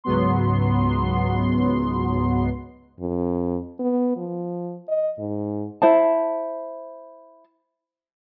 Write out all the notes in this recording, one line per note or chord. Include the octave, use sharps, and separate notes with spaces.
C#2 G#2 F#3 B3 C6
F2
B3
F3
D#5
G#2
E4 C5 A5